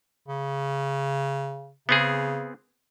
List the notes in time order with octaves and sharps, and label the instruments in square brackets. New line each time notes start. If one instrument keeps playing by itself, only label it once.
[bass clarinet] C#3
[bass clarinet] C#3 [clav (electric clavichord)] B3 C4 G#4